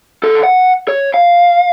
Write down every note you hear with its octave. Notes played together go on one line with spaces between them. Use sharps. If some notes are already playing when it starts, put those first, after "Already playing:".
D#3 A4
F#5
C#5
F5